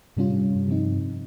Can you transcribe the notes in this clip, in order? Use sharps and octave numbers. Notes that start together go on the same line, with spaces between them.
G2 C3 G3 C#4 F4
G#2
G2
C3 F3 C4 D#4